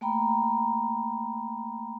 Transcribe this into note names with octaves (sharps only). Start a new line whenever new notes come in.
A3 A#3 G5 A#5 B5